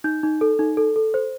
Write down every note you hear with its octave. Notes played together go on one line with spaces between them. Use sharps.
D#4 G6
D#4
A4
D#4
A4
A4
C5